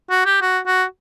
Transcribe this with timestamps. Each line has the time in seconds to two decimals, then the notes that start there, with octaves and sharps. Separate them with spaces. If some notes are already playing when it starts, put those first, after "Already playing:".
0.10 F#4
0.25 G4
0.42 F#4
0.67 F#4